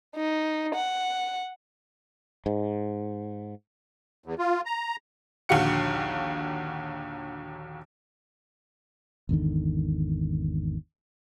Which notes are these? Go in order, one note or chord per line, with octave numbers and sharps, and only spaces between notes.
D#4
F#5
G#2
E2
F4
A#5
A#1 D#2 D3 F#4 F5 C#7
G#1 E2 D3 D#3